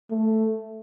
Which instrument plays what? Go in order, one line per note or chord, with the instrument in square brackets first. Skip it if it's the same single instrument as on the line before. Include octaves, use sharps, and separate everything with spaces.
[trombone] A3